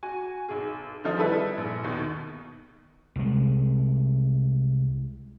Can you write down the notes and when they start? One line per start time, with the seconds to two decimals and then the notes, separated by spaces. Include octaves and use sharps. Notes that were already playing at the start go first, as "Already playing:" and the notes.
0.03 F#4 G#5
0.49 B1 G#4
1.04 D3 D#3 F3 D#4
1.17 G3 E4 A4 B4 E5
1.57 A#1
1.84 D#2 B2
3.16 C2 G#3